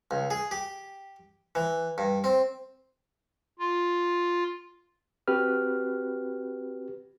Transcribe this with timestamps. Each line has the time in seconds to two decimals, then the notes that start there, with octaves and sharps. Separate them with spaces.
0.11 C#2
0.31 G#4
0.51 G4
1.55 E3
1.98 G2
2.24 C4
3.59 F4
5.28 C4 F#4 G4 B4 F6